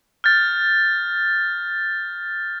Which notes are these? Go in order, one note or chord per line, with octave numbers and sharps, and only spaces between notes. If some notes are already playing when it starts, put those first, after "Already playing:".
F6 G6 A6